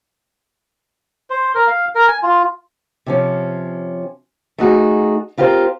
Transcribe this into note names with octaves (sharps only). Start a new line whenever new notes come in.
C5
A#4
F5
A#4
G#5
F4
C3 F3 C#4
A3 D#4 F#4 G#4
C4 F4 G4 A#4 C5